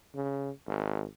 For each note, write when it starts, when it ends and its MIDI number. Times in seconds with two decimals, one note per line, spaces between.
0.15 0.50 49
0.67 1.05 32